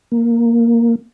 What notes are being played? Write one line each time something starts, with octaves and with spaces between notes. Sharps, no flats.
A#3